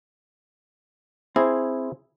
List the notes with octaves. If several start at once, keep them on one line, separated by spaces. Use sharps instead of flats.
C4 E4 G#4